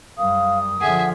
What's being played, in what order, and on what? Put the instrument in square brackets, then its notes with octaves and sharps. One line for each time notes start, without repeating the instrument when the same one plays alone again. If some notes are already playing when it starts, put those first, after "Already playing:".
[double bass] F#2 G3 [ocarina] F5 [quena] D#6
[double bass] D3 F3 [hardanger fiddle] G#4 E5 [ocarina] F#5